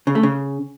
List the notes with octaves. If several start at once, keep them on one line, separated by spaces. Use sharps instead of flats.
C#3
A3
C#3